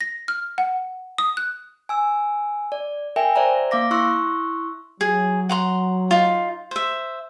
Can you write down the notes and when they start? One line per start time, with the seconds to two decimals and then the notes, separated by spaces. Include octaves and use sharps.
0.01 A#6
0.28 F6
0.58 F#5
1.18 D#6
1.37 F#6
1.89 G#5 E6
2.72 D5
3.16 A#4 E5 G5 G#5
3.36 C5 D5 E5 A#5
3.71 A#3 F5 D6 A#6
3.91 E4 C6 C#6 E6 F#6
5.01 F#3 G#4
5.49 F#5 A#5 C6
6.11 D#4 F4
6.71 C5 E5